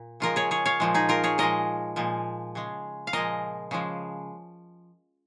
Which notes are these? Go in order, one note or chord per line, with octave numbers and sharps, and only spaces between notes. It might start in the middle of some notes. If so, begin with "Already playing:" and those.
Already playing: A#2
C#3 F3 G#3 F4 A#4
G#4 C#5
G#4 C#5
C#5 F5
A#2 F3 G#3
D#4 G#4
F4 A#4
G#4 C#5
A#2 F3 G#3 A#4 D#5
A#2 F3 G#3
C#3 G#3
F5
A#2 F3 G#3 A#4 D#5
C#3 F3 G#3